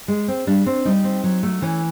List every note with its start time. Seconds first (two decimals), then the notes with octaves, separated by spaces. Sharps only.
0.08 G#3
0.28 C4
0.47 G3 D4
0.66 C4
0.85 G3 D#4
1.04 C4
1.24 F#3
1.43 A3
1.62 E3 C#4